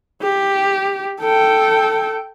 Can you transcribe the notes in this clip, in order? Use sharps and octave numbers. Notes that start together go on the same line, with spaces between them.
G4
A4 G5